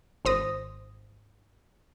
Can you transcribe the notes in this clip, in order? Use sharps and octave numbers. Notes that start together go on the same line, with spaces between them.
G#1 C5 D#6 A#6